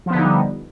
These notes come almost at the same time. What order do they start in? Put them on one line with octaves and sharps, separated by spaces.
F3 B3 D3 D#4 G3